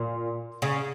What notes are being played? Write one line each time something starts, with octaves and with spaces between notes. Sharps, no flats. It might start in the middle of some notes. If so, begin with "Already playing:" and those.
Already playing: A#2
C#3